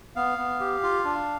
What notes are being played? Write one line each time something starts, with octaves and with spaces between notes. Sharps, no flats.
B3 F5
B3
G4
F4
D4